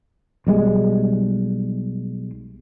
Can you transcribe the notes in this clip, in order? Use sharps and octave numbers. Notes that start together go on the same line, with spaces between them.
B1 G3 G#3